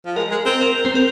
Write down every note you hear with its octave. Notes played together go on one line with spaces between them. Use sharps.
F3
G#3 A#4
G#3
C4 A#4
A#4
C4 C5
A#4